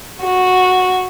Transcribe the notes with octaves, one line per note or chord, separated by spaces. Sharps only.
F#4